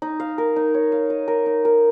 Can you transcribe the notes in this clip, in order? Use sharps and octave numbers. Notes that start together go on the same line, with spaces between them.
D#4
F5
A#4
D#4
C#5
F5
D#5
A#4
D#4
A#4